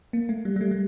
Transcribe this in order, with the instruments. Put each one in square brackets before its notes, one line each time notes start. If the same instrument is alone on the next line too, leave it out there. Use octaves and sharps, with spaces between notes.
[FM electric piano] A#3
A3
G3
G3
A3
G3